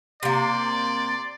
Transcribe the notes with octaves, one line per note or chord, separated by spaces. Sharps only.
C3 A#3 D5 C6